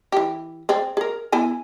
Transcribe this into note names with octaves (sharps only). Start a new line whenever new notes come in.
E3 G4
C4 G#4 D5
G#4 A#4
B3 E4 G#5